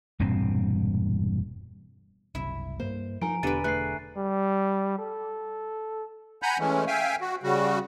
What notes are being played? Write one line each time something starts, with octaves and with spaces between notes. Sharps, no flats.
E1 G2 A#2 C4
F#1 C2 C3 E4 E5
G2 A#3 C5
F3 D#4 A#4 G#5 A#5 D7
E1 D3 B3 G4 B4 E5 A6 D#7
A3 G#4 B4 F#6 C7
G3
A4
F#5 G#5 A#5 B5 G6
E3 G#3 A3 C#4
E5 F5 G5 G#5
F#4
C#3 G3 F#4